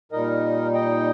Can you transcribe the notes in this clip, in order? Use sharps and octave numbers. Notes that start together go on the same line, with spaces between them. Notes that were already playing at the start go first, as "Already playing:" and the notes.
A#2 G3 D#4 A#4 D#5
D#5 G5